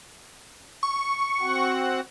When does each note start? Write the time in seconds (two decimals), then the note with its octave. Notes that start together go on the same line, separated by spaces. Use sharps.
0.83 C#6
1.40 C4 F#4 F#5